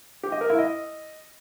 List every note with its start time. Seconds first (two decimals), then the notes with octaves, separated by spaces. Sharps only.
0.23 G4
0.32 D#5
0.41 A#4
0.50 E4
0.58 D#5